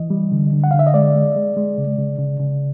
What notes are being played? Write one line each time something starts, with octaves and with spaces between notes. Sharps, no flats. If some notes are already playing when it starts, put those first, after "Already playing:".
Already playing: E3 D#5
G3
D3
D3
F#5
D3 F5
E5
D#5
G#3 D5
G#3
G#3
G#3
C#3
C#3
C#3
C#3